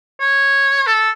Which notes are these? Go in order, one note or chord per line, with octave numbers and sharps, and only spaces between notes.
C#5
A4